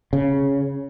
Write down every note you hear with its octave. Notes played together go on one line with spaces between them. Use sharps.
C#3